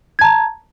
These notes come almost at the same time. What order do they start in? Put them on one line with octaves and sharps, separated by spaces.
G#6 A5 A#5